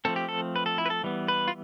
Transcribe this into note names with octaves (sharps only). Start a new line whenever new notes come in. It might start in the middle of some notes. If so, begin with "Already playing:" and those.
F3 A3 C4 A4
G4
A4
B4
A4
E4
B4
A4
E3 G3 B3
B4
F4